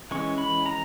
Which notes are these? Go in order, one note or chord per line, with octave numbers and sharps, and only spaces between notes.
E3 G#3 C#4 C#6
B5
A#5